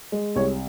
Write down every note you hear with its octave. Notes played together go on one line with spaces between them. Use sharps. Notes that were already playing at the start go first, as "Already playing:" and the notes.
G#3
C2 C#5